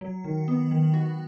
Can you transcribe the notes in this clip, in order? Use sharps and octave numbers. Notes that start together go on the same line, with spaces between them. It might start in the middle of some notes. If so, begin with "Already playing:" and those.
F#3
D#3
B3
D#3
F#4